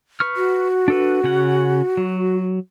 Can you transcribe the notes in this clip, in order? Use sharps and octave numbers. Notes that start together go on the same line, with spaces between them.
B4 C#6 F6
F#4
D4 A4 B4
C#3 C#4 F#5
F#3